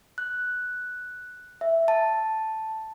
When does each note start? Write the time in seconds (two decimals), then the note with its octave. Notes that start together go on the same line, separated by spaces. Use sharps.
0.18 F#6
1.61 E5
1.88 A5